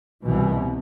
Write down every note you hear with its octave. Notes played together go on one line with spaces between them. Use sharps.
C2 B2 E3